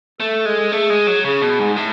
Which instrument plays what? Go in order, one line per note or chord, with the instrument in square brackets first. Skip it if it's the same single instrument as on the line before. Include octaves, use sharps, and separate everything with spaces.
[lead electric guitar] A3 [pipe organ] A4
[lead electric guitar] G#3
[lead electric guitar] A3 [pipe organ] G#4
[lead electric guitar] G#3
F#3
[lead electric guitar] C#3 [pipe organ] G#4
[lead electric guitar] B2
G#2
A2